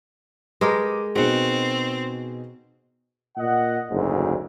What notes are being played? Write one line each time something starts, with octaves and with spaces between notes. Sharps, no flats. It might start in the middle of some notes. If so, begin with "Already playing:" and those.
G#3 A#4 B4 G5 D6 D#6
B2 C4 D#4 F#4 G#4 F#5
A#2 D#5 F#5
F#1 D2 G#2